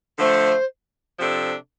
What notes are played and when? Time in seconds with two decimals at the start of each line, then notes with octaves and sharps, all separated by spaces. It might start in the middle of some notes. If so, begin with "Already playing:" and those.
0.18 D3 F3 A3 C5
1.19 C3 F3 D4 A4